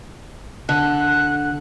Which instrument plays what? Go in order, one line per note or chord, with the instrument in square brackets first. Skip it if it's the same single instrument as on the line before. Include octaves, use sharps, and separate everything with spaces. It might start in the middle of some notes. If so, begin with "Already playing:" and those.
[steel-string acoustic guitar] D3 [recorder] F#6